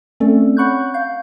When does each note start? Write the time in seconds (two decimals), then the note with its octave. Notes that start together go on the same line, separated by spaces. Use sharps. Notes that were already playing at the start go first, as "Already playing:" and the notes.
0.20 A3 C4 C#4 A4 D5
0.57 C#5 F#5 B5 C#6 F#6 G6
0.94 F5 G6